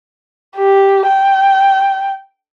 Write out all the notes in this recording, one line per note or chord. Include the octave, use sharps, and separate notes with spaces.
G4
G5